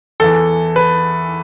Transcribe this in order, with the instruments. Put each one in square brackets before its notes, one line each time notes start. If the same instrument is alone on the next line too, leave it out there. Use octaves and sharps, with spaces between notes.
[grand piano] E2 E3 A4
B4